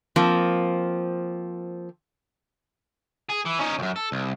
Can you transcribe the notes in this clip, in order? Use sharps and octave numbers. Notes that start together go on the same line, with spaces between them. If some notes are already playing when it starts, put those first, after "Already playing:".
F3 A#3 C4
G#4
E3
C#4 D#4
C#2 F#2
A4
C2